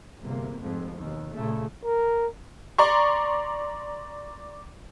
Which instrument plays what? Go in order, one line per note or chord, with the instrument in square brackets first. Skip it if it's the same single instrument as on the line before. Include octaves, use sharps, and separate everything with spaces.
[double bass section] G1 E2 C3 A#3
F1 F2 G#2 F3
D#2 B2
A#2 C#3 A3
[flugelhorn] A#4
[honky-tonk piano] D5 A#5 C6 C#6